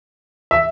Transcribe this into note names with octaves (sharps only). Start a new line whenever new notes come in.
E5